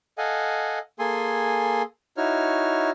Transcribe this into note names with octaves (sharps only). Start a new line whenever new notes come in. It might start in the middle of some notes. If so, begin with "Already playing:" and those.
A4 D#5 F5 F#5 G#5
A#3 G#4 A4 G#5 C6
D#4 E4 F#4 C#5 F6